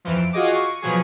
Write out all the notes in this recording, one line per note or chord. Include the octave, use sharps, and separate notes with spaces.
F2 E3 F3
D7
F4 F#4 G#4 D#5 D6
C#6 C7
B2 F3 F#3 G#4 C#6